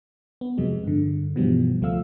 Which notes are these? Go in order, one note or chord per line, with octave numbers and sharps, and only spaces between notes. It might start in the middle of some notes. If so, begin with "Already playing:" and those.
B3
F2 C3 F#3 G#3
G2 D3
G2 B2 E3 F3 G3 B3
C#2 F3 A3 F5 E6